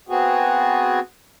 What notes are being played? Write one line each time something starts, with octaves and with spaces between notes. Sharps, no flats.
B3 C4 F#4 G#4